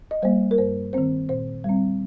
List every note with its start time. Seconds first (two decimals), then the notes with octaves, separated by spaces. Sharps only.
0.11 D#5
0.22 G3 A#3 C5
0.51 A#4
0.58 G2 C5
0.93 D#3 C4 C5
1.29 A#2 C5
1.64 G3 C4